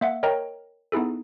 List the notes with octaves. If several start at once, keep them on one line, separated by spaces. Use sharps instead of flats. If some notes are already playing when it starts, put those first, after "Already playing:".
A#3 E5 F#5
A#4 C#5 D#5 G5 A#5
B3 D#4 E4 G#4 A4